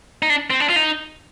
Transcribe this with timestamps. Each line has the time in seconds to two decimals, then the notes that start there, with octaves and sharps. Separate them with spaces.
0.22 D#4
0.30 D4
0.50 C4
0.60 D4
0.70 F4
0.76 D#4